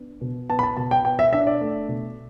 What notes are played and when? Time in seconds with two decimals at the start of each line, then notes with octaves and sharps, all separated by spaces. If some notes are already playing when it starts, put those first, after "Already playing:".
Already playing: B3 D4
0.21 B2
0.50 B3 A5
0.59 B5
0.63 A5
0.77 B2 A5
0.91 G5
1.05 B3 G5
1.19 E5
1.33 D4 E5
1.47 D5
1.61 A3
1.88 B2